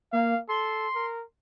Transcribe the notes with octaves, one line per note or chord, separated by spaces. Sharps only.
A#3 F5
A4 C6
A#4